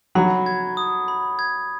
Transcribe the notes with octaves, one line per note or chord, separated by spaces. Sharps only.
F#3 B5
G#6
D#6
B5
G#6